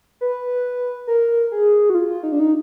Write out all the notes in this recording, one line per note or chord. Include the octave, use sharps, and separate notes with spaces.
B4
A#4
G#4
F#4
F4
D#4
D4
D#4